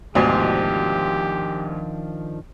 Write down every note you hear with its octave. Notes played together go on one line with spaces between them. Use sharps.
D2 G#2 B2 D#3 F3 D4 G4